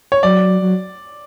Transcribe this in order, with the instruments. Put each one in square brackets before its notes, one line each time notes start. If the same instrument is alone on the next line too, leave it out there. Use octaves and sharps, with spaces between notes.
[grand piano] C#5
[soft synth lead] F#3 [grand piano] D5
[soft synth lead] F#3